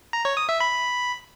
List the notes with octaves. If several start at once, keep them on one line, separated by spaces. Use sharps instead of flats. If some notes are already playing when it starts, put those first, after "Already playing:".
A#5
C#5
D#6
E5
B5